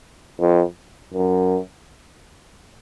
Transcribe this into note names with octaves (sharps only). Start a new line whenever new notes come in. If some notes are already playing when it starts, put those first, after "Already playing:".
F2
F#2